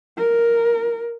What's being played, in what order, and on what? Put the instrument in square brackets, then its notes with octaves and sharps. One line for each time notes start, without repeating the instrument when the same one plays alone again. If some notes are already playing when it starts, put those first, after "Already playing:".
[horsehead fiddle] A#4